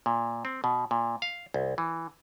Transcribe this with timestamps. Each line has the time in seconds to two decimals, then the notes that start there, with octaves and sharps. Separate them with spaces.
0.06 A#2
0.45 C4
0.64 B2
0.91 A#2
1.22 F5
1.54 C2
1.78 E3